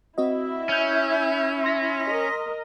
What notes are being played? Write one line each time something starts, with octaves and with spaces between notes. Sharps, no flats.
C4 E4 F#4 D#5 E5
C#4 G6 G#6
C6 A#6 B6
A#4 D#5